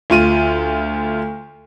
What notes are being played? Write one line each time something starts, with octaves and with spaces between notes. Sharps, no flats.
D2 F4 D#7